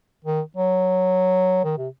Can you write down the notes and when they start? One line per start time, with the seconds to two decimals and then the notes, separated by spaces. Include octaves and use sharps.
0.25 D#3
0.57 F#3
1.64 D#3
1.78 C3